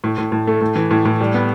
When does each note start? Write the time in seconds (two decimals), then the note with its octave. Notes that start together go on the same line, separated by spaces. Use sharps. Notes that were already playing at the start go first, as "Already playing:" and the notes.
0.04 A2
0.18 A2
0.32 A2
0.47 A3
0.61 A2
0.75 E3
0.91 A2
1.05 A2
1.21 G3
1.34 B3